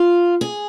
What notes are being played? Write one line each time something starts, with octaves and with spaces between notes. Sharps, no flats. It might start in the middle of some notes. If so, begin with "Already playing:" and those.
Already playing: F4
G#4